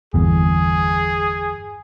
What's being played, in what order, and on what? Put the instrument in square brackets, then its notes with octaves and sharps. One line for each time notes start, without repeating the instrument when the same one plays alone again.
[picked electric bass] G1 E2 [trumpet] G#4